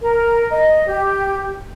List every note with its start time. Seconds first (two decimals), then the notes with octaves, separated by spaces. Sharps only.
0.01 A#4
0.51 D#5
0.87 G4